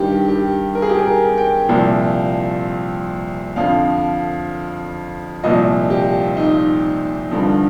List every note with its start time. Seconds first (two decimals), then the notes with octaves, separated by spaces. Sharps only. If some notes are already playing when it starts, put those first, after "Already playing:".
Already playing: G2 D#3 G4
0.28 G4
0.75 A#4
0.82 G#4
0.90 G4
0.97 G#4
1.06 A#4
1.38 G5
1.69 C2 A#2 F3
3.56 F2 D3 F3 F5
5.44 C2 A#2 F3 D#5
5.90 G4
6.37 D#4
7.31 G2 D3 F3